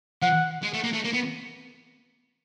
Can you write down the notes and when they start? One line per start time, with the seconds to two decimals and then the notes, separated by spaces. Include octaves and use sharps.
0.22 F3 F#5
0.63 G#3
0.74 A3
0.84 A#3
0.93 A3
1.05 A#3
1.14 B3